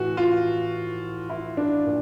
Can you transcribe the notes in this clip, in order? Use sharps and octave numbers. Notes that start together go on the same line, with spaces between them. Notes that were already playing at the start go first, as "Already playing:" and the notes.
Already playing: A2 E3 F#4
F4
E4
D4
A#2